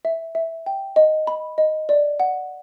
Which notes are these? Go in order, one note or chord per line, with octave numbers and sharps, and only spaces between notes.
E5
E5
G5
D#5
B5
D#5
D5
F#5